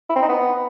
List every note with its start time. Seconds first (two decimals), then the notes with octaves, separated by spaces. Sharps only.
0.09 E4
0.16 C4
0.22 D#4
0.29 B3